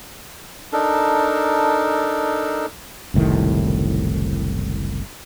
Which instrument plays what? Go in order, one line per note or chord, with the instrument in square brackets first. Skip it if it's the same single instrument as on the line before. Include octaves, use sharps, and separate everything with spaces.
[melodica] D4 D#4 A4 A#4
[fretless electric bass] F#1 C2 A2 D#3